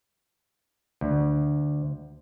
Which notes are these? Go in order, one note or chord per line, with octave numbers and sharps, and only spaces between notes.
D2